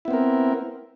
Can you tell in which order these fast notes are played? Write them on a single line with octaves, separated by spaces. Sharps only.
E4 B3 C4 A#4